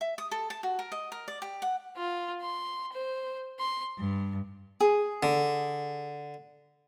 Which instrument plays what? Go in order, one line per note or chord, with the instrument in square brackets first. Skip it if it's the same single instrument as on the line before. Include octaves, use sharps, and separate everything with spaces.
[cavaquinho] E5
D#6
A4
A5
F#4
A#4
D#5
A#4
D5
G4
F#5
[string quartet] F4
C6
C5
C6
G2
[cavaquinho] G#4
[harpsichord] D3